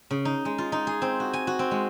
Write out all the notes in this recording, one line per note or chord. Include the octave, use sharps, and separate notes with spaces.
C#3
D#4
G#3
F4
D#4
G#4
C4
F#4
G#5
F#4
C4
G#3